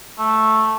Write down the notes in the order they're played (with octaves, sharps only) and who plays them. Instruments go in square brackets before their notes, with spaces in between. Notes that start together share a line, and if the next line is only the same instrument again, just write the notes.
[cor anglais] A3